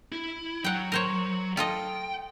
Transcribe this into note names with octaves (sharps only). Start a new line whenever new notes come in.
E4
F#3 F#5 G5
A#4 C5 C#5
F4 A4 D#5 G5